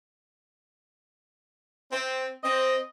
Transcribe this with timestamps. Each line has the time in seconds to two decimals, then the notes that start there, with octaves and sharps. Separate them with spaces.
1.92 C4
2.44 C4 D#5